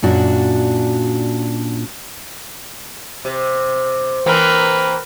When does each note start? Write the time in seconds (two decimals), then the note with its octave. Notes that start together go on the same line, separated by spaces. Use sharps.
0.02 F#2 A#2 D4 F#4
3.25 C3
4.26 E3 A#3 C4 A#4 B4